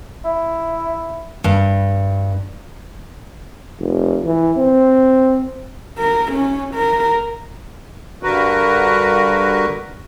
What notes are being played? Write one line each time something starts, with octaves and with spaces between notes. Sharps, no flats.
E4
G2
F1
E3
C4
A#4
C#4
A#4
G2 D3 F#4 A#4 B4